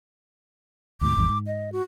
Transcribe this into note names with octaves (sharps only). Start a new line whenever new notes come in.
D2 G#2 B2 D6
G#1 E2 G2
G#2
D#5
F#4